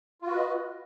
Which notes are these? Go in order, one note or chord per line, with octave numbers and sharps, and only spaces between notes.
F4 F#4 B4 D#5